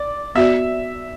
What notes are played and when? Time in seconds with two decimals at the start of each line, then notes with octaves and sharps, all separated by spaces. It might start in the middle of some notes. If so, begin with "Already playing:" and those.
Already playing: D5
0.35 B3 F#4 D5 E5